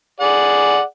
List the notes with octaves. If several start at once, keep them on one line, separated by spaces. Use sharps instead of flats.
G#4 D5 F#5